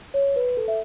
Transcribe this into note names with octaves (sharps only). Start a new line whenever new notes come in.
C#5
B4
A4
E5